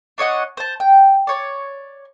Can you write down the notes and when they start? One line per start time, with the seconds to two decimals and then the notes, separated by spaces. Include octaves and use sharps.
0.18 D4 C#5 D#5 F#5
0.57 C5 A5
0.80 G5
1.27 C#5 D5